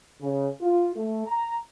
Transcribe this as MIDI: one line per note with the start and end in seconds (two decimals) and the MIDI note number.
0.22 0.48 49
0.61 0.91 65
0.96 1.26 57
1.27 1.55 82